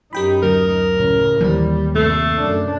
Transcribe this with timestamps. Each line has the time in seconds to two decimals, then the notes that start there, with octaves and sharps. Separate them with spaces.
0.13 F#2 D#4 G4 G5 B5
0.43 D2 F#3 A#4
0.94 A1 C#3
1.41 D#2 E3 G3 C5
1.95 G2 C3 A3 C7
2.38 F#2 D4